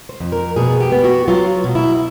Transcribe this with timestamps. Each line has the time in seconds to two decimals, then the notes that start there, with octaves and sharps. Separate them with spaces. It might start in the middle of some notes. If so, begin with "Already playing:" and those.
0.09 C5
0.20 F2
0.32 A#4
0.56 B2 G#4
0.80 G4
0.92 B3
1.04 F#4
1.28 F#3 F4
1.64 B2
1.75 E4